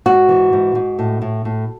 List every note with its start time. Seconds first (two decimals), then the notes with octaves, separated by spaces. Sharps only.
0.06 G#2 F#4
0.29 E3
0.53 G#2
0.75 G#2
0.99 A2
1.22 A2
1.45 A2